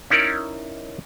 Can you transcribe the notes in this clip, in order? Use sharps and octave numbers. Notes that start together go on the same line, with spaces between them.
C#4 D#4 E4 A#4 D5